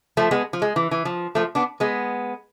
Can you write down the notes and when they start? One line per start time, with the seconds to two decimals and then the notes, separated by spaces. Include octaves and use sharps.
0.17 F3 A3
0.31 G#3 B3
0.53 F3
0.62 G#3
0.76 E3
0.91 E3
1.05 F3
1.35 F3 A3
1.55 B3 D4
1.80 G#3 B3